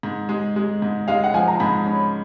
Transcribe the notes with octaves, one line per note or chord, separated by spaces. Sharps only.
G#2
G#3
G#3
G#2
G#3 F5
F#5
F3 G#5
A#5
G#2 B5
C#4